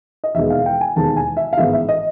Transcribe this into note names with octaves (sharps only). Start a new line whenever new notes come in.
D#5
E1 D#2 D#3 G#3 B3 E5
F5
G5
G#5
E1 D#2 D#3 G#3 B3 A5
G#5
E5
F5
A1 G#2 D#3 G#3 B3 E5
E5
D#5